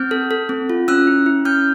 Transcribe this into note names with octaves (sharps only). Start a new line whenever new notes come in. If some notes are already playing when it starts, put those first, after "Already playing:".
Already playing: C4 F6 G6
A4
A4
C4
F4
C#4 E6 F#6
E4
E4
C#4 F6 G6